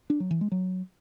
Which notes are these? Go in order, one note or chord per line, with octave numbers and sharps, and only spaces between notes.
D4
F#3
E3
G#3
F#3